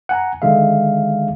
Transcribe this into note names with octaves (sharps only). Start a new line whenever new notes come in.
F#5 G#5 A#5
D3 D#3 G#3 E5 F5